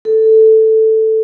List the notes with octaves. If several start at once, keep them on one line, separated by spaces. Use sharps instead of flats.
A4